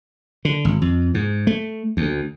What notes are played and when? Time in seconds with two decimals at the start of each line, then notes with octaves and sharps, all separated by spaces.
0.45 D3
0.65 G#1
0.82 F2
1.14 G#2
1.47 A3
1.97 D2